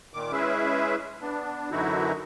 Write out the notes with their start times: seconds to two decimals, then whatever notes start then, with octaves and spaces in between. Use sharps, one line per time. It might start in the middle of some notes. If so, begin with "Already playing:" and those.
0.14 A#2 D#3 D6
0.33 G#3 C#4 E4 G#4 B4 E5
1.22 B3 D4
1.71 F#2 D3 E3 D#4 E4 F#4